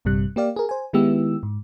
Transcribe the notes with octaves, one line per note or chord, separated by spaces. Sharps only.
A#1 G2 C3 G3 F#6
A#3 G4 D5 F5
G#4 A#4
C5 G#5
D#3 G#3 B3 E4 G4 E6
G#2